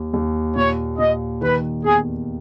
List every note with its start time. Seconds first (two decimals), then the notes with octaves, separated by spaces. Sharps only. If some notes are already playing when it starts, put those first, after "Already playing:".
Already playing: D#2
0.13 D#2
0.56 A#2 C#5
0.99 A#2 D#5
1.42 D#3 B4
1.84 E2 G#4